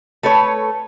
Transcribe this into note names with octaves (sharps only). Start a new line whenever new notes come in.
A3 A4 B4 C#5